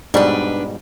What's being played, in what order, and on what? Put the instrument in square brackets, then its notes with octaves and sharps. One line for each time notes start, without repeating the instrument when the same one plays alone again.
[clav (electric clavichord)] G#2 B2 G3 [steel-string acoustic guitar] D4 B4